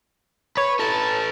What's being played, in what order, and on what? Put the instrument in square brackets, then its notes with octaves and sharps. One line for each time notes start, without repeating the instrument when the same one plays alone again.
[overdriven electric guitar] B4 [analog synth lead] C#5
[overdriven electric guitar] A4 B4 [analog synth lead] A5